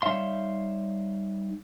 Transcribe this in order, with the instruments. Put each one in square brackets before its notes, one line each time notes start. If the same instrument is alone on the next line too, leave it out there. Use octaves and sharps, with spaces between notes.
[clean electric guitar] G3 D#4 C#5 E5 F5 C6